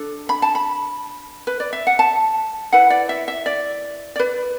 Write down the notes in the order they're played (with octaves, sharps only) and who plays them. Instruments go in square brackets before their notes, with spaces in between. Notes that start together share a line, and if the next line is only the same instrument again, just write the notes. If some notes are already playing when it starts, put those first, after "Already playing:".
Already playing: [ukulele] D4 A4
B5
A5
B5
B4
D5
E5
F#5
A5
E4 B4 F#5
D5
E5
E5
D5
D5
B4